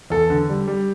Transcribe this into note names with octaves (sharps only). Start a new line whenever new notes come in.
E2 A4
D3
G3
G3